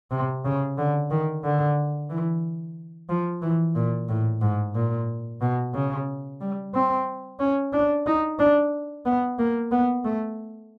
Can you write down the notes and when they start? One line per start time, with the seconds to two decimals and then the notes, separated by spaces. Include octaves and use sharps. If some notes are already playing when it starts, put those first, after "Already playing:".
0.11 C3
0.45 C#3
0.78 D3
1.11 D#3
1.44 D3
2.10 E3
3.09 F3
3.42 E3
3.75 A#2
4.09 A2
4.41 G#2
4.75 A#2
5.41 B2
5.74 C#3
6.41 G3
6.74 C4
7.40 C#4
7.73 D4
8.07 D#4
8.39 D4
9.06 B3
9.39 A#3
9.71 B3
10.05 A3